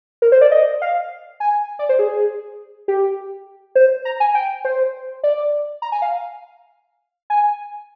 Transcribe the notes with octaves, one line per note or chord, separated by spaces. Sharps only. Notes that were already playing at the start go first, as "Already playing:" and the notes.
A#4
C5
D5
D#5
F5
G#5
D5
C5
G#4
G4
C5
A#5
G#5
G5
C5
D5
A#5
G#5
F5
G#5